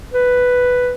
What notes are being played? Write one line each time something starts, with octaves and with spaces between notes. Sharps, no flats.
B4